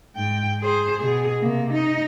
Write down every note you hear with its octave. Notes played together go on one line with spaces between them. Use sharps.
G#2 G5
G#4 C5
B2 G#4
C3 A#3
D#4